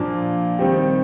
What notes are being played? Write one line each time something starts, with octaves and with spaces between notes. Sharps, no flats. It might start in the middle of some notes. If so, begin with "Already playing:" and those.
Already playing: A#2 F3 A#3 D4
D#3 G3 C4 D#4 G4